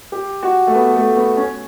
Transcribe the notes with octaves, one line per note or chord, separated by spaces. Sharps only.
G4
F#4
A3
B3
A3
B3
C#4